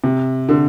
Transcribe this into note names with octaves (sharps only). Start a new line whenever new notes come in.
C3
D3